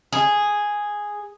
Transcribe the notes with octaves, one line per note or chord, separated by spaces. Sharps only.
G#4